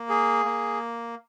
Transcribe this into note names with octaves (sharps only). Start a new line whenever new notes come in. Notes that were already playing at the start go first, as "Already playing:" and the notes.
Already playing: A#3
G#4
A#3